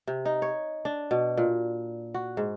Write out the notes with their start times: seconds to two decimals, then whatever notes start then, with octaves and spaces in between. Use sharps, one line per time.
0.07 C3
0.25 D#4
0.42 C#5
0.85 D4
1.11 B2
1.37 A#2
2.14 F#4
2.37 G#2